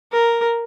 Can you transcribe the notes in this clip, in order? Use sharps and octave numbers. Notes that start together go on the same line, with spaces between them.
A#4